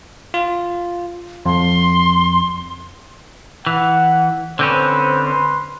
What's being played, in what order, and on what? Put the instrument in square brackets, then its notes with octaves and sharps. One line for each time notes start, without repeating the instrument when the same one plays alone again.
[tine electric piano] F4
[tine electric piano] F2 [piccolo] C6
[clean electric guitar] E3 [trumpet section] F#5
[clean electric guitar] D3 C4 C#4 [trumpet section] B4 C5
[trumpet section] B4 C6